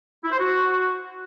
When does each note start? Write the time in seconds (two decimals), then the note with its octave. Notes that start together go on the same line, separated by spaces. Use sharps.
0.24 E4
0.32 C5
0.40 F#4